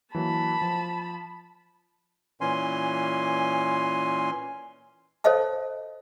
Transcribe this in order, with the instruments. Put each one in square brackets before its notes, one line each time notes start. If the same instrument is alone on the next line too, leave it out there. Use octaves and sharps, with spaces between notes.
[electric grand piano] E3 F#3 A#3 [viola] A5 B5
[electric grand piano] F3
[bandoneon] A#2 E3 C#4 G#5 C6
[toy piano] A4 C5 C#5 D#5 F5 A5